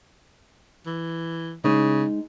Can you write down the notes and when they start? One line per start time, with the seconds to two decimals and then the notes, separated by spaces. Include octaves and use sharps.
0.86 E3
1.64 C#3 G#3 D#4